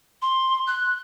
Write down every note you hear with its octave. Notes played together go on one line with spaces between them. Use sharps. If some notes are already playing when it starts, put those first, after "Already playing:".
C6
F#6